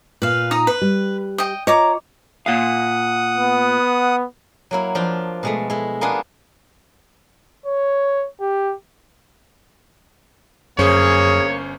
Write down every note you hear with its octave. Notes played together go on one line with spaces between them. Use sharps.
A#2 B4 F5
D#4 A#5 D#6
B4
G3
D#5 G5
F4 C#5 D#5 A#5 D6
A#2 F5 F#5 D#6
B3
F#3 A#3 E4
F3 D4 F4
B2 G#3 A3
G#3 E4
A#3 B3 D4 F4 G#4 B4
C#5
G4
G1 F#2 A#3 C#4 G#4 C5 C#5